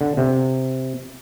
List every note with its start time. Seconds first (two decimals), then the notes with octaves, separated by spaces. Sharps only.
0.01 D3
0.17 C3